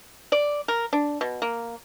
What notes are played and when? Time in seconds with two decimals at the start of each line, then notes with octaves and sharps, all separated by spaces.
0.32 D5
0.68 A#4
0.93 D4
1.21 B2
1.42 A#3